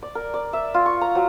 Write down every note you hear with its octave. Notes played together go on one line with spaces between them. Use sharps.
D5
A#4
D5
E5
F4
C#6
A#5
F#3